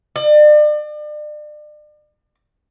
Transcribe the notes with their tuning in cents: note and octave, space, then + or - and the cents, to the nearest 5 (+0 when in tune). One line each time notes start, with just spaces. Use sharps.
D5 +40